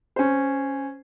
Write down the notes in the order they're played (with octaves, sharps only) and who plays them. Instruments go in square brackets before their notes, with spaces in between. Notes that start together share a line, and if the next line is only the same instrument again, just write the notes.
[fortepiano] C#4 C5